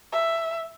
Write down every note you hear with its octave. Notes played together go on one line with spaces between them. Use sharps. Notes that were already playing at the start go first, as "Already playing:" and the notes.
E5